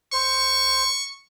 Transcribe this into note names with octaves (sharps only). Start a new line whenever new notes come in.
C5 C#6